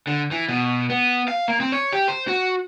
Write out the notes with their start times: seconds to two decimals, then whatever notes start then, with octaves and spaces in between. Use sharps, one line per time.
0.07 D3
0.31 E3
0.49 B2
0.90 B3
1.28 F5
1.48 A#3
1.60 C4
1.72 C#5
1.93 G4
2.08 C5
2.28 F#4